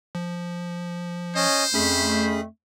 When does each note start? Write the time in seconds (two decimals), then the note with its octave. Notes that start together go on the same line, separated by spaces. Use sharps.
0.15 F3
1.36 C#4 C5 D#5
1.74 F2 A3 C#4 G#4 B5 B6